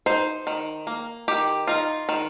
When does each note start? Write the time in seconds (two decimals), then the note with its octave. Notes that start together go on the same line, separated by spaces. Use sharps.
0.06 D#4 C5
0.47 D#3
0.87 A#3
1.28 D#3 G4
1.67 D#4 F4
2.09 D#3